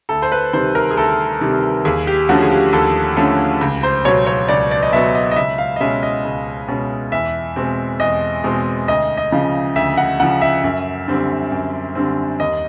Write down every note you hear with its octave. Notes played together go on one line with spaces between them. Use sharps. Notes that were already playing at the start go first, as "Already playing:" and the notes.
D2 A4
C5
B4
C3 D#3 G3 C5
A#4
G#4
D2 A4
C3 D#3 G3
D#2 G#4
G4
D3 F3 A3 C#4 F#4
G#4
G4
D#2 A4
D3 F3 A3 C#4
C#2
C5
B2 F#3 B3 C#5
C#5
C#2 D5
D5
D#5
B2 F#3 B3 E5
D#5
D#5
C#2 E5
F5
D#5
B2 G#3 C#4 E5
D#5
C#2
B2 G#3 C#4
E2 E5
B2 G#3 C4
E2 D#5
B2 G#3 C4
D2 D#5
D#5
C#3 F3
D2 E5
F#5
C#3 F3 F#5
E5
F#2
D3 G3 C4
F#2
D3 G3 C4
D#2 D#5